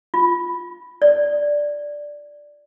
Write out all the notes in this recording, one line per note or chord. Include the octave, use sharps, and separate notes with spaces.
F4
D5